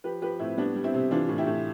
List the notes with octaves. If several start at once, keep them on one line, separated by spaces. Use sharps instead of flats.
F3 G4 B4
F3 G4 B4
A2 C4 E4
G3 B3 D4
G3
C4 E4
C3
E3 D4 F4
A2
E4 G4
A2